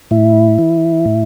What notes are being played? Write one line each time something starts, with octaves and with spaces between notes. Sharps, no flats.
A2 E4
E3
A2